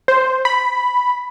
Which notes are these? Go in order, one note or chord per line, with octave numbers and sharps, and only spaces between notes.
C5
B5